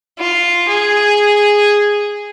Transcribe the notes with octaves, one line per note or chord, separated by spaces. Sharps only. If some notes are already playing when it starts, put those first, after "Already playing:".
F4
G#4